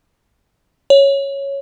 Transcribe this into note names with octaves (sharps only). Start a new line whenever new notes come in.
C#5